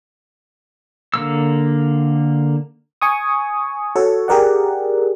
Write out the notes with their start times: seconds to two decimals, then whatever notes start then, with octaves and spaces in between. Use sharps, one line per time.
1.14 D3 A#3 E6
3.02 G#5 C#6 D#6
3.96 F#4 A4 C#5
4.28 G4 G#4 A#4 D5 F#5